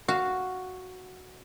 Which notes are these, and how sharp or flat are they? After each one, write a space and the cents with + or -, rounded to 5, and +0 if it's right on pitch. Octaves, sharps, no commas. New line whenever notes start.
F#4 +0 F5 +0